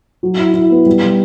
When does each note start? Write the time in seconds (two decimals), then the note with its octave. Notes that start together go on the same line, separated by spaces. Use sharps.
0.23 F#3
0.39 E4
0.54 E4
0.70 B3
0.86 G3
1.03 G3